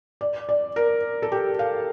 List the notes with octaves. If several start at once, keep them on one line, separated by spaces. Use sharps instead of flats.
D5
D5
A#4
A4
G4
F5